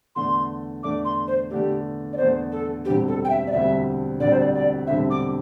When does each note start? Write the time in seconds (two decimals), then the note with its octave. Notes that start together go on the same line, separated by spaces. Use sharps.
0.16 E2 D3 A3 D4 C6
0.83 E2 D3 A3 D4 D6
1.05 C6
1.27 C5
1.50 E2 D3 A3 D4 G4
2.13 D5
2.17 E2 D3 A3 D4 C5
2.52 A4
2.85 E1 D2 D3 G3 C4 G4
3.08 A4
3.25 G5
3.30 E5
3.47 D5
3.52 E1 D2 D3 G3 C4 E5
4.20 E1 D2 D3 G3 C4 D5
4.30 C5
4.40 D5
4.54 D5
4.87 E1 D2 D3 G3 C4 E5
5.10 D6